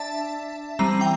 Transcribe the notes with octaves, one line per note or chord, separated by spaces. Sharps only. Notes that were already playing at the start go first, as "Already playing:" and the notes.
Already playing: D4 D5 E5 A5
E3 G3 C4 A#5
G5